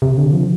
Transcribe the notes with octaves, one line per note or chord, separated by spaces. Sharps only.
C3
D3
F3